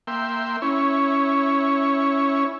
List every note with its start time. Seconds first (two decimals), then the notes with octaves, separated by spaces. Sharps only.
0.07 A#3 E5 G5 C6
0.62 C#4 E4 C#5